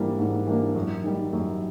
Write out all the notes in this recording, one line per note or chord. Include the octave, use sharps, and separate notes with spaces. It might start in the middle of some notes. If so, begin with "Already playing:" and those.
Already playing: G#2 E3 G3 A#3 D4
G#2
E3 G3 A#3 D4
F#2
D#3 G3
F#2